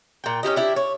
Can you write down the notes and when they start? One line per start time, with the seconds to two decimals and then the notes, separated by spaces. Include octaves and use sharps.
0.24 A#2 G5
0.43 C#4 E4 G4 D#5
0.56 D4 E4 G4
0.76 C#5